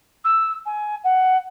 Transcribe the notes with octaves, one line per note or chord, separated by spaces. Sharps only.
E6
G#5
F#5